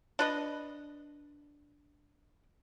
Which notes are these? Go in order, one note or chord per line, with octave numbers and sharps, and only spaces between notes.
D4 B4 D#5